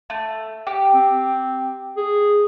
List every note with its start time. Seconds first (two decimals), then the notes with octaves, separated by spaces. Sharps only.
0.10 A3
0.67 G4
0.94 C4
1.97 G#4